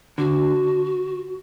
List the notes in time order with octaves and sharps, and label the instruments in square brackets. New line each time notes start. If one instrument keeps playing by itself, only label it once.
[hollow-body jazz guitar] D3 [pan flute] F#4